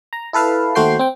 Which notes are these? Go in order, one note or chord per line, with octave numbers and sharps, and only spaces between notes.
A#5
E4 A4 B4 F5 A5
D#2 A3 F#4 C5 G5 C7
C4 G5